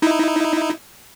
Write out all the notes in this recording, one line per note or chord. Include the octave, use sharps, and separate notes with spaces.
D#4 E4